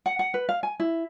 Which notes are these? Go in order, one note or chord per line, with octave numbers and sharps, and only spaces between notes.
F#5
F#5
B4
F5
G#5
E4